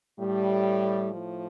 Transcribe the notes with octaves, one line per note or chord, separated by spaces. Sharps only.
A2 G3
A2 F3